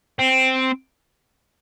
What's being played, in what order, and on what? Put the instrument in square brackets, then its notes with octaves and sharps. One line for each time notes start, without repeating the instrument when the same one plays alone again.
[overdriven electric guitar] C4